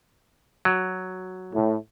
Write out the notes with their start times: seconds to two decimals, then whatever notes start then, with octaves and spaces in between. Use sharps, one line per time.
0.65 F#3
1.53 A2